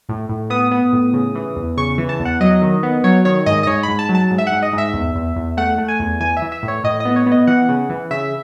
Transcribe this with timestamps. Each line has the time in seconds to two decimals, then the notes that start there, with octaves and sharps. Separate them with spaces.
0.09 A2
0.29 A2
0.50 B3 D#6
0.71 B3
0.93 A2
1.13 C#3
1.35 E3
1.56 E2
1.77 C#3 C#6
1.98 E3
2.09 A5
2.19 E2
2.25 F#5
2.40 F#3 D#5
2.62 D#3
2.83 B3
3.04 F#3 C#5
3.25 D#3 C#5
3.46 G#2 D#5
3.63 D#5
3.67 G#2 C#5
3.83 B5
3.88 G#2
3.99 A5
4.09 F#3
4.15 A5
4.31 G#2
4.38 E5
4.47 G#2 F#5
4.62 D#5
4.73 G#2
4.78 E5
4.94 E2
5.15 E2
5.36 E2
5.57 A3 F#5
5.78 A3
5.88 G#5
5.99 E2
6.20 E3 G#5
6.37 E5
6.42 E3
6.52 E5
6.63 A2
6.68 C#5
6.84 A2 D#5
7.00 B3 D#5
7.16 C#5
7.26 B3
7.32 D#5
7.47 E3 F#5
7.69 C#3
7.90 E3
8.11 C#3 E5